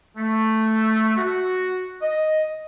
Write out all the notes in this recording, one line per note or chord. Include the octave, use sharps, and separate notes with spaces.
A3
F#4
D#5